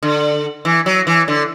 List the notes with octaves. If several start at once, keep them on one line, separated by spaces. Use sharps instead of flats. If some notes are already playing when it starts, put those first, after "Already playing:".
D3
E3
F#3
E3
D3